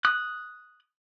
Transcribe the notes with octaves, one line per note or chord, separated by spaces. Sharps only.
D#6 F#6